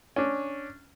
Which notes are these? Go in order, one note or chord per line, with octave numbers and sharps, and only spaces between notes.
C#4 D4